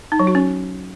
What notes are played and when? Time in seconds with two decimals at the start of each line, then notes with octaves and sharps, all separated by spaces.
0.12 D#4
0.20 F#3
0.27 F#4
0.35 C#4